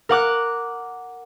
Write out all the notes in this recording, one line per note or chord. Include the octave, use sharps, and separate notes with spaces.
A#4 F#5 D6 F#6